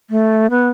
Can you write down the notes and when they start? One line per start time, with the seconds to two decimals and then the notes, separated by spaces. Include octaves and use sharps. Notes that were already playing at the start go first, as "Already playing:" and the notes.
0.10 A3
0.50 B3